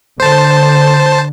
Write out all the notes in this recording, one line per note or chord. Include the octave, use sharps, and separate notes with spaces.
D3 C5 A5